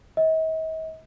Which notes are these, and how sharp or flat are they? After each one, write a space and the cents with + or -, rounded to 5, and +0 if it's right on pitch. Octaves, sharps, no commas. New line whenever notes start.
D#5 +45